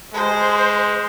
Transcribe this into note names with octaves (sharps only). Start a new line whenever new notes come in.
G#3 C5